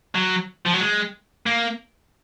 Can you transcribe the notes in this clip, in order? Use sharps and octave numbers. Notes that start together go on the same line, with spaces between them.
F#3
F3
F#3
G#3
A#3